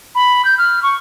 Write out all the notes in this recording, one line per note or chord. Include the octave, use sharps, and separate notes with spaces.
B5
G6
F6
C#6